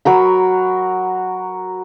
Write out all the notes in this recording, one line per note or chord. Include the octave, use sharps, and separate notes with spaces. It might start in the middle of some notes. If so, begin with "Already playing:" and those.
F#3 F#4 A#4 B5